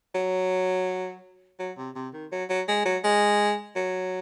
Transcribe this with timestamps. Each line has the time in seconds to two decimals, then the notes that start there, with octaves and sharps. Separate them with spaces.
0.15 F#3
1.59 F#3
1.77 C3
1.95 C3
2.13 D#3
2.32 F#3
2.50 F#3
2.68 G#3
2.86 F#3
3.04 G#3
3.76 F#3